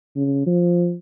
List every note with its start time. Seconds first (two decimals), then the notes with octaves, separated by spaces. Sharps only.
0.16 C#3
0.47 F3